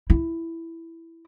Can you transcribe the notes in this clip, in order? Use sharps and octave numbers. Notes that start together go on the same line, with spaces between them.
E4